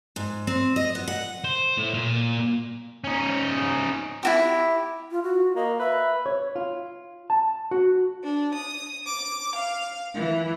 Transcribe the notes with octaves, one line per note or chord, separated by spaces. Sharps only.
G#2
C4
D#5
B3
F#5
C5
A2
A#2
C#4 D#4
E4 F#4 G4
F4
F#4
A#3 D#5
B4 E5
C#5
F4
A5
F#4
D4
D#6
D6
F5
E3